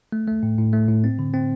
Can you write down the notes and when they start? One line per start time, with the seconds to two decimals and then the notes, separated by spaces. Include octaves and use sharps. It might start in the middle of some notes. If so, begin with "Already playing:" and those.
0.12 A3
0.27 A3
0.43 A2
0.58 A2
0.73 A3
0.89 A2
1.04 C4
1.19 D3
1.34 C4